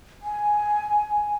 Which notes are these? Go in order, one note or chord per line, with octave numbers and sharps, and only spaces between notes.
G#5